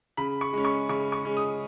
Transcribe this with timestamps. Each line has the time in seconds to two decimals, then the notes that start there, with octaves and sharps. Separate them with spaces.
0.17 C#3 B5
0.41 C#6
0.53 G#3 C#4
0.65 C#6
0.89 C#3 C#6
1.12 C#6
1.25 G#3 C#4
1.37 D#6